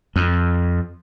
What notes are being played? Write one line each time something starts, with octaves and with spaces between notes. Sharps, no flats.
F2